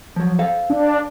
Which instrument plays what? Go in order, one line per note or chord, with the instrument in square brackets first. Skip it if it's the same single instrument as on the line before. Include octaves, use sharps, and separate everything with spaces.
[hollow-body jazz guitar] F3 F#3
A4 C5 F5
[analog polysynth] D4